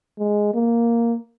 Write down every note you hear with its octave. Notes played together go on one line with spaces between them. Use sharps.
G#3
A#3